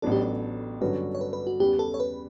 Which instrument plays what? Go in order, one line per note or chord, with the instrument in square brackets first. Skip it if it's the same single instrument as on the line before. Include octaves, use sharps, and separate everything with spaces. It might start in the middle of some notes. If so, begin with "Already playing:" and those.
[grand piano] A1 A2 F#3 B3 D4 [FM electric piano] A4
[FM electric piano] G4
A4
[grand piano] G2 D3 F#3 C#4 F#4 [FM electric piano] B4
[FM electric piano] C#5
B4
B4
F#4
[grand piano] E2 C#3 G3 B3 [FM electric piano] G4
[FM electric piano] A4
C#5
B4